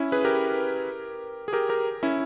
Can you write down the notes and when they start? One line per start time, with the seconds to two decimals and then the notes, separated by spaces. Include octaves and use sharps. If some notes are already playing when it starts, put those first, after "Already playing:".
Already playing: C#4 E4
0.12 G#4 B4
0.25 G4 A#4
1.48 G#4
1.53 G4 A#4
1.69 G4 A#4
2.03 C#4 E4